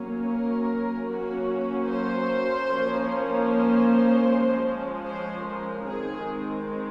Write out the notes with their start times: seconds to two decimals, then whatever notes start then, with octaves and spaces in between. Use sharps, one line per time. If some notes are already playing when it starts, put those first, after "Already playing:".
Already playing: F#3 A#3 C#4
0.27 A#4
1.08 F#3 A#3 C#4 F#4
1.87 C5
2.67 F3 A#3 C#4
3.47 C5
4.27 F3 G#3 C#4
5.06 C5
5.46 A#4
5.86 D#3 G#3 C4 G#4